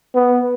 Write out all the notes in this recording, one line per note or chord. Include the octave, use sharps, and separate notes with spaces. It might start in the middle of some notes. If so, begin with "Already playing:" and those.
B3